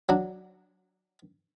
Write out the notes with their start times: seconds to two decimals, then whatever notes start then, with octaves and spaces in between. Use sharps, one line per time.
0.09 F#3 D4